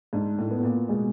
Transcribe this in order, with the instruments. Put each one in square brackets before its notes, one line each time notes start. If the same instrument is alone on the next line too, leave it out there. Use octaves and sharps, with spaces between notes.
[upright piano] G#2 [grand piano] D4
[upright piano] A2
[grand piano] B3
[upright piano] A2
A#2
[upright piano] B2 [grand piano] G#3